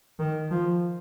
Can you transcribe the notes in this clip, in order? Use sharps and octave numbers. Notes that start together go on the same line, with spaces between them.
D#3
F3